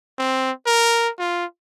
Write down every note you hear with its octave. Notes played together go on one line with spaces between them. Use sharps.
C4
A#4
F4